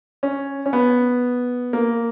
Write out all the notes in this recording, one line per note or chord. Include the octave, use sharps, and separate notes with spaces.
C#4
C#4
B3
A#3